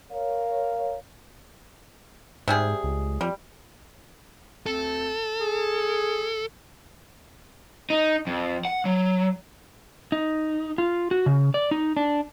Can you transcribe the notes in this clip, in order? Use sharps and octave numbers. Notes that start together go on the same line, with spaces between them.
A#4 C#5 F5
G#2 C3 G3 G#4
C#2
F2 G3
D2 A3 C4 A4
G#4
D#4
F2
F#5
F#3
D#4
F4
F#4
C#3
D5
D#4
D4